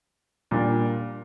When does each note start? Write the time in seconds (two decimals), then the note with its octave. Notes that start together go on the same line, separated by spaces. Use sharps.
0.51 A#2 G3 A#3 D4